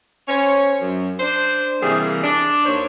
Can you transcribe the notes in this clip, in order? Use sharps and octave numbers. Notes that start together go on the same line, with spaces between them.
C#4 C5 C#5
F#2
D4 C5
C3 E3 G3 A#3 G#4
D4 D5
D#2 A#3 C5 C#5